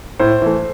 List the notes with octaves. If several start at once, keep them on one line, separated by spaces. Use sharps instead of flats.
A2 C5
E3 A3